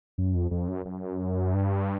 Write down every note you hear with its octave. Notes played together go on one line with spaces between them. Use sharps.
F#2
F2
F2
F#2
F#2
G2